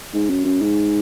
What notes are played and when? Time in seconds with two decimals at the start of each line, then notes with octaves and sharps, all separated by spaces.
0.14 G#2
0.30 F#2
0.45 F#2
0.62 G#2